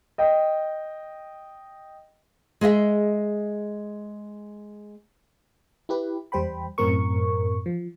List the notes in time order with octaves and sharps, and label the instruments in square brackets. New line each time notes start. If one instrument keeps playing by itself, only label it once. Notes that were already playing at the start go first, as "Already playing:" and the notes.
[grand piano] D#5 G5
[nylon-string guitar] G#3 G#4 D#5 E5
[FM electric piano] E4 G4 B4
E2 G3 C5 G5 B5
F#2 A2 C4 A#4 C#6
F3